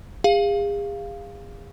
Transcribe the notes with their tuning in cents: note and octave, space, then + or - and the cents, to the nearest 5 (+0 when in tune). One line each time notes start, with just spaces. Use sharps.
G#4 -40 F5 -5